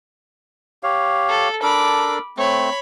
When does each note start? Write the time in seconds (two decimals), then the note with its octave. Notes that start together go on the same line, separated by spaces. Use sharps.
0.83 G4 C#5 F5
1.28 A4
1.63 D4 A4 A#4 B5 D6
2.37 A3 C4 C#5 B5